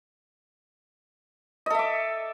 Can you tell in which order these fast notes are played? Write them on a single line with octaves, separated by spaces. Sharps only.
D#5 A4 E5 D6